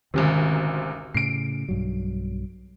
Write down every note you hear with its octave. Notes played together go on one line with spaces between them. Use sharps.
G#1 D2 C3 D#3 C#4
A2 C#3 C7 D7
B1 G2 F#3